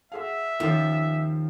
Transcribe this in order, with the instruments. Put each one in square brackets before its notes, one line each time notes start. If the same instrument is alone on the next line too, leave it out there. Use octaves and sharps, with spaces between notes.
[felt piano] F#4 G#4 F5 [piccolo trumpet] E5
[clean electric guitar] D#2 [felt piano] D#3 C#4 F4 [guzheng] F3